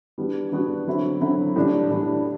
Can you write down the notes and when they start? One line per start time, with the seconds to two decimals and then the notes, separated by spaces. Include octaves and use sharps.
0.18 E3 G3 B3 D4 F#4
0.52 E3 G3 B3 D4 F#4
0.87 D3 F#3 C4 E4
1.21 D3 F#3 C4 E4
1.56 A2 E3 G3 D4
1.90 A2 E3 G3 D4